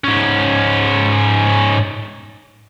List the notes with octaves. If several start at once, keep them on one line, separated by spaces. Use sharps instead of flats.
G#2 C#4